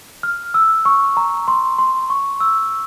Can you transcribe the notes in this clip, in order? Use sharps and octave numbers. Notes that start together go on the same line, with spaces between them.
F6
E6
C#6
A#5
C6
C6
C#6
E6